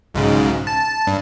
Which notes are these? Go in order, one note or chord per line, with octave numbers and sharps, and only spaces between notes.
B1 G#2 C#3
A5
G2